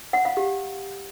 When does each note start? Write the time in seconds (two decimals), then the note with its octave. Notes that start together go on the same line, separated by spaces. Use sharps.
0.13 F#5
0.25 F5
0.37 G4